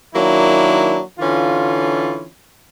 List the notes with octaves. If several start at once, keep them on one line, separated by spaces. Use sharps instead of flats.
D#3 F#3 A#3 D4 E4
D3 E3 C#4 F4